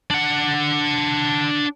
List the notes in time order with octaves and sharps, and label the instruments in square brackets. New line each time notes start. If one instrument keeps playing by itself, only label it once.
[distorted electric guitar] D4 F#5